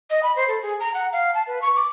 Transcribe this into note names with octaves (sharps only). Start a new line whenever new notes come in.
D#5
B5
C5
A4
G#4
A#5
F#5
F5
A5
B4
C#6
D6